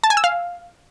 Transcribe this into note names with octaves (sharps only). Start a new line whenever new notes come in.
A5
G#5
E6
F5